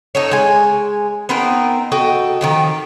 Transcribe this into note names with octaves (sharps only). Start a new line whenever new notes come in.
D#4 A4 C#5
G#3 G#5
B3 C4 D#4 A#4
F#4 A4 D#5 G5
D#3 F3 G4